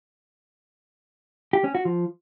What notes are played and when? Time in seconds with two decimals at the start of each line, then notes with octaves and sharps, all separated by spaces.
1.53 G4
1.64 C#4
1.75 F#4
1.85 F3